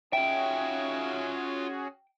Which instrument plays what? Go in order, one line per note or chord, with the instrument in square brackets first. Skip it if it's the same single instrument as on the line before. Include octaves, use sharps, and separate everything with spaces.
[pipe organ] C#4 F#4 G#4 [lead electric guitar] F4 E5 [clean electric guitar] G5